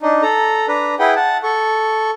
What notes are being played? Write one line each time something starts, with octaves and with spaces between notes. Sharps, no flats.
D4 D#4
A4 A#5
D4 B4 A#5
E4 G#4 B4 F#5 G5
F#5 A5
A4 C#6